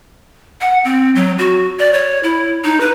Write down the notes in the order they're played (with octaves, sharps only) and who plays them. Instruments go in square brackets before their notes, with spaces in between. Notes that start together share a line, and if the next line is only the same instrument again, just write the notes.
[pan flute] F#5
C4
F#3
F#4
D5
C#5
E4
D#4
B4